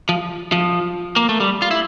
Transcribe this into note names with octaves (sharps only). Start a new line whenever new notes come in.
F3
F3
A#3
A3
G3
F4
E4